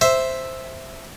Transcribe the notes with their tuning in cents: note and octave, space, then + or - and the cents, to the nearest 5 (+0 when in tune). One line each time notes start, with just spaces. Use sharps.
C5 +0 E5 +0